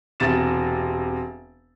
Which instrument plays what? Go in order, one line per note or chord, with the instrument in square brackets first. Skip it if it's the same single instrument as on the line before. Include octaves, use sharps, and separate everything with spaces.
[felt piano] E1 C3 A6 E7